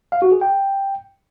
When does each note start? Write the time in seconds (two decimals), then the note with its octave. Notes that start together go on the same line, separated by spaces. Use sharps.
0.12 F5
0.22 F#4
0.32 G#4
0.41 G5